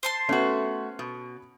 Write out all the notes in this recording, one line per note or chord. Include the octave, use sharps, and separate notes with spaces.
C5 A5 C6
A3 B3 C#4 F#4
B2